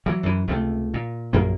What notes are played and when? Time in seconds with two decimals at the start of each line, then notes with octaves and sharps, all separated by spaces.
0.06 E3 F#3
0.23 F#2 E3
0.47 C#2 C3 E3 A3
0.94 A#2
1.33 A#1 F#2 A#3